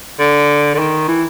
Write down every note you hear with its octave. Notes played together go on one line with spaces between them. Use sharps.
D3
D3
D#3
E3